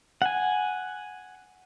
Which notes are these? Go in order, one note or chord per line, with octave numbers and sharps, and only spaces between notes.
F#5 G#5